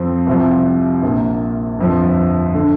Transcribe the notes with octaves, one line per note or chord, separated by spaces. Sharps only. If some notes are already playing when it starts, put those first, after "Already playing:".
Already playing: F2 F3 C4
C2 C3 F3
A#1 A#2 A#3
G1 F2 F3
D3